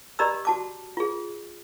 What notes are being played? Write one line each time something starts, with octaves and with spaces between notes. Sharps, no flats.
G4 D5 D#5 A#5 B5 E6
F#4 A5 D6
F4 G#4